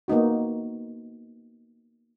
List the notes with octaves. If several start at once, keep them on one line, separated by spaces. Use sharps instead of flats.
A#3 B3 D#4 F#4